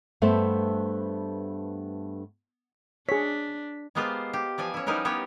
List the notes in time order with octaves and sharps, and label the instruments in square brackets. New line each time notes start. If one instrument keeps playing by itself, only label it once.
[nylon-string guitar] G2 A3 B3 C5 E5
[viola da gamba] D4 [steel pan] G#4 C#5 [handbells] B6
[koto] G#3 A#3 B3 F4 G4 C5
G4
E3 F3 D5 G#5
C#4 E4
F3 G3 D#4 E4 A#4 B4
B3 G4 C#5